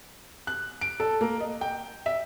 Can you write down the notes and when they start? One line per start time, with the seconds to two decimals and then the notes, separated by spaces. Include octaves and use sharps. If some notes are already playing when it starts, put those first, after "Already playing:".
0.47 F#6
0.81 D7
1.00 A4
1.21 A#3
1.40 D#5
1.61 G5
2.06 E5